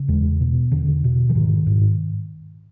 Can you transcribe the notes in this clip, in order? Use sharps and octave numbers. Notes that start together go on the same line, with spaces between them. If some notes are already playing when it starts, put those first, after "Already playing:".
Already playing: C#3
E2 G#3
B2
E2 D3
B2
E3
G#2 D#3
G#2